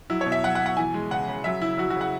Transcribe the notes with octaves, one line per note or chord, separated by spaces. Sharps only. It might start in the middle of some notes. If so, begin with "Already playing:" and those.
F#3 E4
C#5
B2
E5
F#3 F#5
F#5
B2
F#5
E3 G#5
G#3
C#3 F#5
C#3
F#3 E5
C#3 E4
F#3 F#4
F#4
C#3
F#5